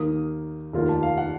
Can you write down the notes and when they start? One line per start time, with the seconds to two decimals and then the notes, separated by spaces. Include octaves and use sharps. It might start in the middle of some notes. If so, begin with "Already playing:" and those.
Already playing: D#2 D#3 A#3 D#6
0.73 F1 D#2 D#3 A#3 F4
0.88 A5
1.03 F5
1.18 F#5